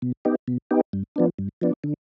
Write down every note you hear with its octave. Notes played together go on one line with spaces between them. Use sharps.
B2
B3 D#4 G4
B2
B3 D#4 G4
G2
F3 B3 D4
G2
F3 B3 D4
D3